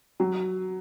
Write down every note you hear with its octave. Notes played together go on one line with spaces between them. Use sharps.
F#3